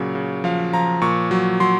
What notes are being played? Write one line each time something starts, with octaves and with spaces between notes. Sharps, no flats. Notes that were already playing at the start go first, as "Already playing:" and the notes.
Already playing: A#2 C#3 F#3
C#3
F3 F5
F3 A#5
A#2 C#6
F#3
F#3 C6